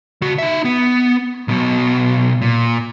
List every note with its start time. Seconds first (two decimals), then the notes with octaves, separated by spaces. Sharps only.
0.22 C#3 F#4
0.38 D#4 E5
0.65 B3
1.48 B1 B2
2.42 A#2